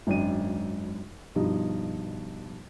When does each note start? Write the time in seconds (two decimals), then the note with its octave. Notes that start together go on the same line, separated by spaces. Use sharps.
0.07 G#1 F#2 D4 D#7
1.35 G2 B2 F3 G3 D#4